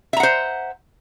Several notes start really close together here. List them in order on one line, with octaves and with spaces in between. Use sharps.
E5 A#5 F#5 C5